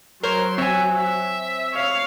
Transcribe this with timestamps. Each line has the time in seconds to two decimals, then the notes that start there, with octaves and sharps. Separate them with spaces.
0.23 F#3 A#4 C5 C#5 C6
0.58 C4 C#5 E5 G#5
0.97 E5
1.73 C#5 F5